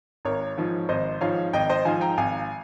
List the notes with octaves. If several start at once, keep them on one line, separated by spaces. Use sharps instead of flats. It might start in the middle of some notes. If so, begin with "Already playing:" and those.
G#1 A#4 C#5
G#2 F3
G#1 C5 D#5
G#2 F3 C#5 F5
G#1 D#5 G5
C5 D#5
G#2 F3 F5 G#5
G5 A#5
G#1 F5 G#5